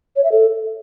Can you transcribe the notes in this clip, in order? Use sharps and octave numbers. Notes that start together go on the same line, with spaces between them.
C#5
E5
A4